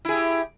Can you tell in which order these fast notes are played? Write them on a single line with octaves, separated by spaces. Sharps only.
E4 G#4 G4